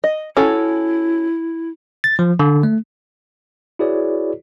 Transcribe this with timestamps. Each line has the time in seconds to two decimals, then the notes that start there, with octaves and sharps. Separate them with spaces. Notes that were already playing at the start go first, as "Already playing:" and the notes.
0.04 D#5
0.37 C#4 E4 F#4 A4
2.04 A6
2.19 F3
2.40 D3
2.63 A3
3.79 E4 F#4 G#4 B4 C#5 D5